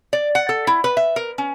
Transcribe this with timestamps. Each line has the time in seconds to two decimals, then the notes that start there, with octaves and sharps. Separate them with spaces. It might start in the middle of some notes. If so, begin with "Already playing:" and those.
0.13 D5
0.35 F#5
0.49 A4
0.67 E4
0.84 B4
0.97 E5
1.16 A#4
1.38 C#4